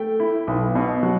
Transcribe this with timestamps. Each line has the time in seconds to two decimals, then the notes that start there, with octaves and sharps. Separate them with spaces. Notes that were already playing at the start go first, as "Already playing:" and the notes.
Already playing: A3 G5
0.20 E4
0.47 B1
0.75 B2
1.03 F#3